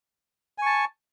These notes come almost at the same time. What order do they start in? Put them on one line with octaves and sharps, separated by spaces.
G#5 C#6 A5